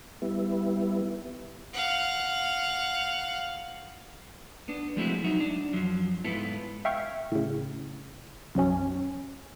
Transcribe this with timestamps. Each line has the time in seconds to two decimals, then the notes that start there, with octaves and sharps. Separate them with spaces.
0.22 G3 B3 E4
1.74 F5 F#5
4.68 B3 D4
4.96 F3 G#3 A3 C4 E4 F#4
5.24 F#3 D#4 F#4 E5
5.40 D4
5.73 F#2 F3 F#3
6.25 G#2 B3 E4 F4 A4
6.85 E5 F5 G5 C#6 F6 G#6
7.32 A2 C#3
8.55 B1 F#2 F#3 C#4